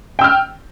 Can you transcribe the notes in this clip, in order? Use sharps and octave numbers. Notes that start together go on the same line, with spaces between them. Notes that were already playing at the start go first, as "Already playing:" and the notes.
G5 E6 F6